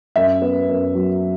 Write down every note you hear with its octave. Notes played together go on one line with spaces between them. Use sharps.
F#2 E5
B3
F#2
F#3